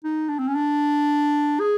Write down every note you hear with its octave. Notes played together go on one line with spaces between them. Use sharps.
D#4
D4
C4
C#4
D4
G#4